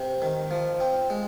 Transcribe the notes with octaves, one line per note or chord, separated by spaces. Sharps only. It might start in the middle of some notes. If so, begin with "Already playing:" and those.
Already playing: C3
D#3
F3
C4
G#3